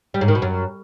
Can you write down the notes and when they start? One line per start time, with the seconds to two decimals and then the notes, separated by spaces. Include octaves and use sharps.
0.14 G3
0.21 G#2
0.28 D#3
0.35 B2
0.42 F#2